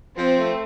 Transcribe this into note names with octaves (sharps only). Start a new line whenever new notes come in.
F3 C4
A3